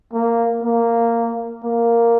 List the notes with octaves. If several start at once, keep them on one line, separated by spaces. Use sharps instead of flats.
A#3
A#3
A#3